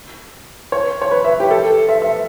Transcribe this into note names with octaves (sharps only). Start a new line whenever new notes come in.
C#5
C#5
B4
E5
G4
A4
E5
E5